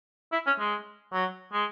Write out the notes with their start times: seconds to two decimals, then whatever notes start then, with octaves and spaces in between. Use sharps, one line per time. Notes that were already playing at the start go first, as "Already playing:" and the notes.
0.32 E4
0.46 C#4
0.59 G#3
1.13 F#3
1.53 G#3